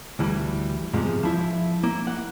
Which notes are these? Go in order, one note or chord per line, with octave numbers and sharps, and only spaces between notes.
D2 E3 G3
E2 G#2 C3 F3 G#3
F3 E4 E5
A#3 E4
F#5